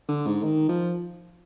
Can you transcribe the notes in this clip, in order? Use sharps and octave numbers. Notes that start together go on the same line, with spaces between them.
D3
G#2
D#3
F3